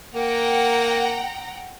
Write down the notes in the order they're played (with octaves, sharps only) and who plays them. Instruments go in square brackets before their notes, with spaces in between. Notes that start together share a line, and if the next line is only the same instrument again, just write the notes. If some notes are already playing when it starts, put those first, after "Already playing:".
[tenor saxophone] A#3 [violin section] F#5 G5 A#5